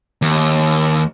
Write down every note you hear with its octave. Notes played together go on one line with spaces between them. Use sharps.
D#2